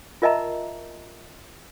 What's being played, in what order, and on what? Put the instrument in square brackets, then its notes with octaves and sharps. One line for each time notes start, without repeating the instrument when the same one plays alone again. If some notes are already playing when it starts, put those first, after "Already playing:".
[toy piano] F4 A#4 D#5 E5 A5 A#5